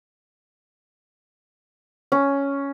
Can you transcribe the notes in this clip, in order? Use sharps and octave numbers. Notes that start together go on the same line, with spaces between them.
C#4